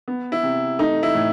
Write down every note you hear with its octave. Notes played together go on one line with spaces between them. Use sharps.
B3
E4
C3
A3 D#4
E4
A2